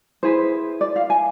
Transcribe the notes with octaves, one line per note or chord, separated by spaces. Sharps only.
E4 G#4 B4 C5
D5
F5
G#5